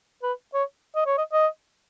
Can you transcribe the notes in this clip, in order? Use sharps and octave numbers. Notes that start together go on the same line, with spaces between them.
B4
C#5
D#5
C#5
D#5
D#5